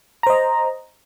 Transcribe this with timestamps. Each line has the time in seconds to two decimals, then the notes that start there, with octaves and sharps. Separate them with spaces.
0.23 A#5
0.27 C5
0.30 D#5